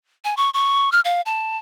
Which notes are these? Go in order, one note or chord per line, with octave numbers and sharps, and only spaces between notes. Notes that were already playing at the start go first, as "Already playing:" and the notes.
G#5
C#6
C#6
F6
F5
A5